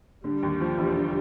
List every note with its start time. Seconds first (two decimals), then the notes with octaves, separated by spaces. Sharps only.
0.24 D3 G3
0.43 D#2
0.61 F3
0.78 E1
0.96 D3